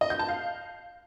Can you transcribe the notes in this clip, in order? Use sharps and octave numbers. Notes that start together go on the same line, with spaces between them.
D#5
G6
A5
F5